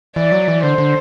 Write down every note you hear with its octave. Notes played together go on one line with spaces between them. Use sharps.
E3 D5
F#3
E3
D3 C5
D3